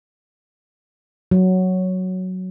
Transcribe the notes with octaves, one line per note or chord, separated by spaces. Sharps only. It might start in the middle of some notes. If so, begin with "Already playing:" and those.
F#3